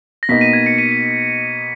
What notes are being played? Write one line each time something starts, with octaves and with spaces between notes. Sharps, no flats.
A#6
B2 A#3 D#4 B6
B6 D#7
G#6
A#6 C#7
B6 D#7
B6